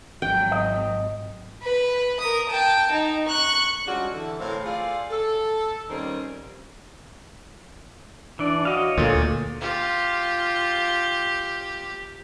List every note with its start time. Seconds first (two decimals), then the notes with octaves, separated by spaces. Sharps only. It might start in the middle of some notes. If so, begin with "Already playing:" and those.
0.22 G#1 F#3 G5
0.52 D#5
1.63 B4
2.20 A#4 D#6
2.49 G5 A5
2.91 D#4
3.27 C#6 F#6
3.87 C#3 G3 G#3 D4 F4 F#4
4.13 D3 E3 A4
4.40 A2 C4 A#4 F5
4.64 F4 G#4 A4 C5 D5 F5
5.10 A4
5.90 D#3 G3 A#3 C4 C#4 A#4
8.39 E3 D4 D5
8.65 F#4 C#5 D#5 F5
8.97 D2 A#2 A4
9.61 F4 G4